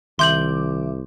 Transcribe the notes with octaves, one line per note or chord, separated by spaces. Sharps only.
C2 D#3 E5 C6 D6 G6 F#7